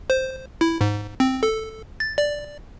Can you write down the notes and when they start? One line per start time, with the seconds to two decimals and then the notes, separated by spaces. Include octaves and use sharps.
0.10 C5
0.61 E4
0.81 G#2
1.20 C4
1.43 A4
2.00 A6
2.18 D5